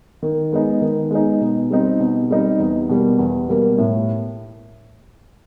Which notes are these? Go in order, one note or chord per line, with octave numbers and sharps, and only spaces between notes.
D#3
G#3 B3 D#4
D#3
G#3 B3 D#4
B2
G3 C4 D#4
B2
G3 C4 D#4
E2
B2 G3 A#3
E2
B2 G3 A#3
A2